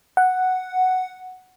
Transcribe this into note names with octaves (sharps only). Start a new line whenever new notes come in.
F#5